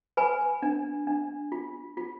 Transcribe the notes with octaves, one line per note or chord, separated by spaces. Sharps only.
B4 G#5 B5
D4
D4
F4
F4